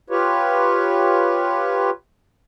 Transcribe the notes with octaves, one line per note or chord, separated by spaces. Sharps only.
F4 G4 B4 C#5